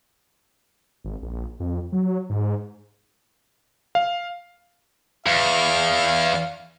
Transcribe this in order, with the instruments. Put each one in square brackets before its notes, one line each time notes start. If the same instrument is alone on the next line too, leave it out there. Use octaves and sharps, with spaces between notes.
[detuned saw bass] G#1
A#1
F2
F#3
G#2
[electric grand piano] F5
[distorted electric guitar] E2 [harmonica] F5